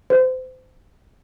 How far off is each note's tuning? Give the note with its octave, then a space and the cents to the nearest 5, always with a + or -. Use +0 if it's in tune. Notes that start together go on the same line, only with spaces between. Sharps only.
C5 -30